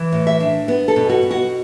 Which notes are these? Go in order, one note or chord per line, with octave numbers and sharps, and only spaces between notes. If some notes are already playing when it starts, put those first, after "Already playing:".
Already playing: E3
A2
E5
D4
B3
A4
B2
F#4
B2
F#4